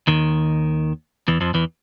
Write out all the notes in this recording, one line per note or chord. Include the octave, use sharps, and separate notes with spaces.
D#2 D#3
E2 E3
F2 F3
E2 E3